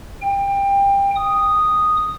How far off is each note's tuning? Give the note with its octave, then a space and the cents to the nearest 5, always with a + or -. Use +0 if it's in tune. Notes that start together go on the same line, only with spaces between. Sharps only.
G5 +25
D#6 -5